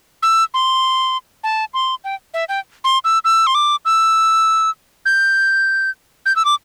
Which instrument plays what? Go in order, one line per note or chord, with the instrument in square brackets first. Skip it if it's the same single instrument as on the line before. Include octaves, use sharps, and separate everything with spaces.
[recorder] E6
C6
A5
C6
G5
E5
G5
C6
E6
E6
C6
D6
E6
G6
G6
E6
D6